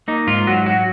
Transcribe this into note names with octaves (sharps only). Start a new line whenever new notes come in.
A#3 D#4
G#2 F4
F#3 F#4
F#3 F#4